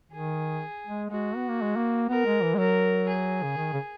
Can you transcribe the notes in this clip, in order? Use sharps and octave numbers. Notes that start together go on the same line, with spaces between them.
D#3 G#4
G#3
G#3 F#4
B3
A#3
G#3
A#3
B3 A#4
G#3
E3
G#3
F#3 A#4
G#4
C#3
D#3
C#3